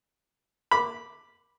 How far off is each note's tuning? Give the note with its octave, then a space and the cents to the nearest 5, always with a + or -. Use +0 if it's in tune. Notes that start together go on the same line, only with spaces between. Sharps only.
B5 -10 D6 +0